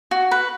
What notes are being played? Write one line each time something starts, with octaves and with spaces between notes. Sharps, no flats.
F#4
B4